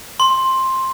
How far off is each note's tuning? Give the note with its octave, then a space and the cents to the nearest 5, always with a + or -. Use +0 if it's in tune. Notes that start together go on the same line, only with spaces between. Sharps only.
C6 +10